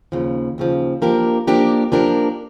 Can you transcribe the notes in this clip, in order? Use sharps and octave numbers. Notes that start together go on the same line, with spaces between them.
D#2 C#3 F3
D#2 C#3 F3
F3 A#3 D4 G4 A#4
F3 A#3 D4 G4 A#4
F3 A#3 D4 G4 A#4